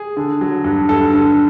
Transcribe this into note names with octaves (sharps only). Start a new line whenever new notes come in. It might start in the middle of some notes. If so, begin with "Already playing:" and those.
Already playing: G#4
D3
F#3
G2
G2 A4
D3